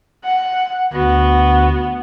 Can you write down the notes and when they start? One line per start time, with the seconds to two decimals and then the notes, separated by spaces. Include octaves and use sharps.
0.24 F#5
0.93 D2 B3 F#4